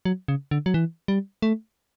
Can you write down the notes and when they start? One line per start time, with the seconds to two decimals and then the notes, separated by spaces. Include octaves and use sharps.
0.05 F#3
0.28 C#3
0.51 D3
0.66 F#3
0.74 E3
1.08 G3
1.42 A3